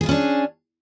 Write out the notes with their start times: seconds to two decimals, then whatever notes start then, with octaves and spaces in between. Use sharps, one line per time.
0.01 G#4
0.03 B3
0.06 F4
0.09 C#4
0.11 D4